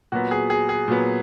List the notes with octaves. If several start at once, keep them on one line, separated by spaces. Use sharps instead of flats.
A#2 F#3 B3 F#4
G#4
G#4
G#4
A#2 F#3 B3